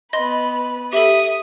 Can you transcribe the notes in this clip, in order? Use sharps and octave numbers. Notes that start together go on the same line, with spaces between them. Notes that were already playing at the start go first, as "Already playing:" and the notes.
B3 D#5 B5 C6
G4 A4 E5 D#6